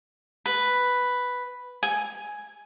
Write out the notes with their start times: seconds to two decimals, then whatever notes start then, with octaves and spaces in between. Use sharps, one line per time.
0.46 B4
1.83 G#5